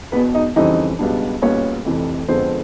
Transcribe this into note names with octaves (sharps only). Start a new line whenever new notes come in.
E1 E2 B2 B3 B4
D#4 D#5
F2 C#3 E3 G3 C4 D#4 D#5
C#2 B2 G3 B3 D4
B1 A#2 G3 B3 C#4 C#5
F1 F2 C3 E3
F2 D3 F3 G#3 B3 C4 C5